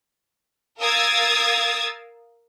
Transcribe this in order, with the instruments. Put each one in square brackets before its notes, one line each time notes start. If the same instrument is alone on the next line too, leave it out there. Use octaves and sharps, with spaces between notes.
[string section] A#4 F5 D#6 E6 G#6 A6